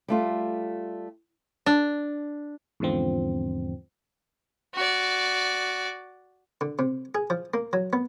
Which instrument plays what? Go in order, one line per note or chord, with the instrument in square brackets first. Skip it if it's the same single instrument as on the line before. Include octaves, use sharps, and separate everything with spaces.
[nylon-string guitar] G3 A3 F4
[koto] D4
[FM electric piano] E2 G#2 D3 F3 C4
[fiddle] F#4 D5
[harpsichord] D3
C3
G#4
F3
A#3
F#3
B3